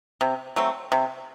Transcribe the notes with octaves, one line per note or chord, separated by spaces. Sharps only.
C3
F#3 A3 C4
C3